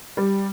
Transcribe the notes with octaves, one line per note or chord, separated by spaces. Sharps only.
G3